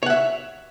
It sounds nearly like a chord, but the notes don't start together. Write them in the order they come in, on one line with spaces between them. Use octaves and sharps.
C#5 F#5 E5